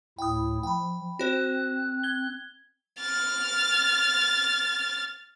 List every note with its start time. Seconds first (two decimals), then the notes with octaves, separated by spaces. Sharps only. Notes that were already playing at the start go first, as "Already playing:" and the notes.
0.19 D2 A2 E4 G5 D#6
0.63 F3 G5 B5
1.19 C4 F#4 C5 F#6
2.03 G#6 G7
3.00 F6 A6